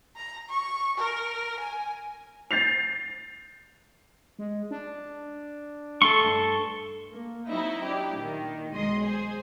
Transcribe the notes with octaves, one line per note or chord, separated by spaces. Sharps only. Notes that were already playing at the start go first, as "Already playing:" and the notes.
A#5
C#6
A#4
G#5
G6 A6 C7 F7
G#3
D4
A3 A4 C6 C#6
G2
A#3
F#3 C4 D#4 E4 D#5
D4 E4 G4
A#2 D#3
B1 G#3 D#5 C6
G#4 C5